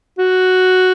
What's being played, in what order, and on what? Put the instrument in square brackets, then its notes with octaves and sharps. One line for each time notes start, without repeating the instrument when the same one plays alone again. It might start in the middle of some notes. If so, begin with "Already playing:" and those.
[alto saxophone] F#4